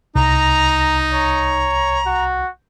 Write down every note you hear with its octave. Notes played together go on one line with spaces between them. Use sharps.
C2 D#4 A#5
C#5 A#5
F#4